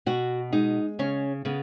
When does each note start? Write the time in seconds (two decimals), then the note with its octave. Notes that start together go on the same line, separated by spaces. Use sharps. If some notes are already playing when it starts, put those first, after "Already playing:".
0.06 B2 F#4
0.52 G#3 D#4
0.99 C#3 C#4
1.45 C#3 B3